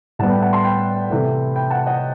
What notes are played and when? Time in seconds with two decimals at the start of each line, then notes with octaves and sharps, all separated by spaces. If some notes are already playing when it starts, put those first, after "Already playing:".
0.19 A2 G3 B3 F#5 A5
0.30 G5 B5
0.42 F#5 A5
0.53 A5 C6
0.64 G5 B5
1.10 C3 E3 A3
1.56 G5 B5
1.70 F#5 A5
1.86 D#5 F#5